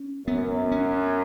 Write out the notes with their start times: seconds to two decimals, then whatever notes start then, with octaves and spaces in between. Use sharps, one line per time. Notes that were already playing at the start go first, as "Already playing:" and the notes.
Already playing: C#4
0.27 F#2 B3
0.72 C#4